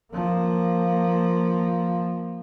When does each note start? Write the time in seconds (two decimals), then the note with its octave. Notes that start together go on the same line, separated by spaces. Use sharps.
0.14 F3 A#3